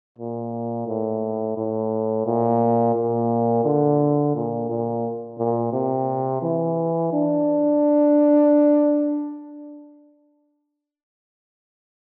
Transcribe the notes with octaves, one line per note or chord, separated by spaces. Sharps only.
A#2
A2
A2
A#2
A#2
D3
A#2
A#2
A#2
C3
E3
D4